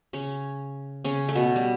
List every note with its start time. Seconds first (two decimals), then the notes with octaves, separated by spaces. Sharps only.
0.13 C#3 C#4
1.04 C#3 C#4
1.29 A3
1.35 B2 B3
1.56 G3